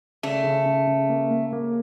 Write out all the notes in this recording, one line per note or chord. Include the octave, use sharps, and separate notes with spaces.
C#3 A3
C#3
C#3
C#3
A#3
A#3
A#3